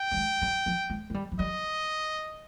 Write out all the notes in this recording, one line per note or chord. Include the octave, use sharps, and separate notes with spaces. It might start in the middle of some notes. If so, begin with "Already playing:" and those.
Already playing: G5
G3
G#3
G3
F3
G#3
G#3
G3
F3
G3 D#5